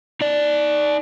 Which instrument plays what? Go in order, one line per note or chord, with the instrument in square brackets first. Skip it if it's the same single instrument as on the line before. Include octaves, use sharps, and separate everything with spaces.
[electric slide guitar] D#4 D5